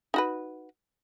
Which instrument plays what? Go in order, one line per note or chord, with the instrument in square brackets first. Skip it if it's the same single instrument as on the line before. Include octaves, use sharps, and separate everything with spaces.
[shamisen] D#4 F#4 B4